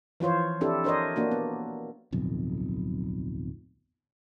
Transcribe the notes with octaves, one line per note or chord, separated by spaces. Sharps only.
E3 F3 F4 C5 C#5
C4 D4 E4 G4 A4
D4 A#4 C5 C#5 D#5
A#3 D4 F#4
B3
D1 B1 F2